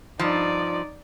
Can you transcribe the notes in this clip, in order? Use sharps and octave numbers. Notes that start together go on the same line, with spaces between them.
G2 F3 D#4 D5